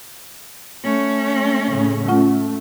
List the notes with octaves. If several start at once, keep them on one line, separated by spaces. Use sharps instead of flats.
A3 C#4
A2 C#3
A3 C#4 F4 F#5